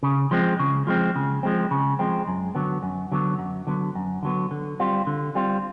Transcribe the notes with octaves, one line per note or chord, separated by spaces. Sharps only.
C#3
F3 G#3 C4
C#3
F3 G#3 C4
C#3
F3 G#3 C4
C#3
F3 G#3 C4
F#2
D3 F#3 B3
F#2
D3 F#3 B3
F#2
D3 F#3 B3
F#2
D3 F#3 B3
D3
G3 C4 F4
D3
G3 C4 F4